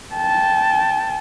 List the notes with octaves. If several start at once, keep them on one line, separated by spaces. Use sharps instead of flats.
G5 A5